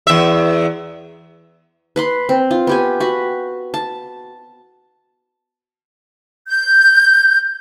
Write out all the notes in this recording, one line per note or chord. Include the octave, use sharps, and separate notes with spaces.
E2 E5
B4 B5 C6
C4
F4
B3 G4 G#5
F#4 B5
A5
G6